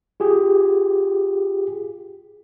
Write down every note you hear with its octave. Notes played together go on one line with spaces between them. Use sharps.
F4 G4 G#4